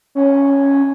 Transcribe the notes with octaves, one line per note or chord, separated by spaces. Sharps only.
C#4